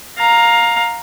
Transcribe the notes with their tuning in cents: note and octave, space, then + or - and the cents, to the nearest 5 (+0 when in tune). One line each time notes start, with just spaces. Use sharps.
F5 +15 A#5 +0